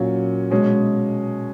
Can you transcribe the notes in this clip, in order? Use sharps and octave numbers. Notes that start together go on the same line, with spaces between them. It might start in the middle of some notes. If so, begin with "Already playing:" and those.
Already playing: A#2 F#3 C#4
B2 G#3 C#4